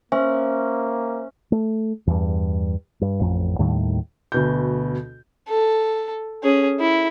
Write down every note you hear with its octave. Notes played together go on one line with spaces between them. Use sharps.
A#3 C#4 C5 E5
A3
E2 G2
G2
A1 F2
D#2 A2 D#3 G3
D2 B2 G6
A4
C#4 G#4
E4